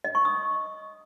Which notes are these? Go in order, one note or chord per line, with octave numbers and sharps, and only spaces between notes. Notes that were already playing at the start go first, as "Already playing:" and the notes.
D#5
C#6
D#6